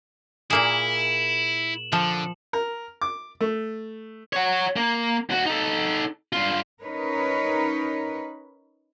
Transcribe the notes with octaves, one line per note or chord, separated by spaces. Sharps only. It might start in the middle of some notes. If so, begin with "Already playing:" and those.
A#2 A#3 E4 G#4 E7 F#7
D3 F3
A#4
D6
A3
C#5 F#5
A#3
D#2 F#4
D#4 A4
G2 F4
C#4 D#4 A#4 B4 C#5